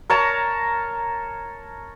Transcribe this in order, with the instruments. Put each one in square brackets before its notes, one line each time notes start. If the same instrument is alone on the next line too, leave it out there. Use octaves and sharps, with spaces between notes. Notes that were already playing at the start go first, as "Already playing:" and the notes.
[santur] A#4 C#5 A5 A#5